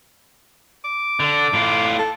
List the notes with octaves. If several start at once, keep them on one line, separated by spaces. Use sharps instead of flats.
D6
D3
A2 F4
A4